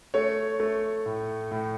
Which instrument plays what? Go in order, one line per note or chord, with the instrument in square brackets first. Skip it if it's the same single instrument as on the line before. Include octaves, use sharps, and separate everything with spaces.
[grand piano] A3 C#5
A3
A2
A2